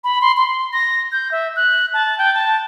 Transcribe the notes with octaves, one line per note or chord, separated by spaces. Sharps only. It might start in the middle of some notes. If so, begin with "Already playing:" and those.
B5
C6
C6
A#6
G6
E5
F#6
A5
G5
A5